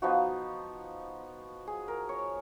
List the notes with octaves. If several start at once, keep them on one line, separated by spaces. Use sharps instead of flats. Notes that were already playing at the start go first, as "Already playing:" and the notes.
F3 B3 D#4 F#4
G#4
A#4
C#5